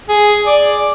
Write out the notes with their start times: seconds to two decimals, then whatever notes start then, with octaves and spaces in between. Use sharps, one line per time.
0.09 G#4
0.46 D5